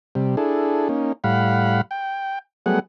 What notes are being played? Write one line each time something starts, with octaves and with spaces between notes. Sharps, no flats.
C3 G3
D4 E4 G#4 A4
A#3 C#4 D#4
A2 G3 F5 F#5 B5
G5
F#3 G3 A3 B3 G#4 F#5